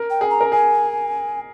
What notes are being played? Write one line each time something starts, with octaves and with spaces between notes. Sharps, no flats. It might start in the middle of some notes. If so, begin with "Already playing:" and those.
Already playing: A#4
G5
G#4
A#5
A#4
G#4 G#5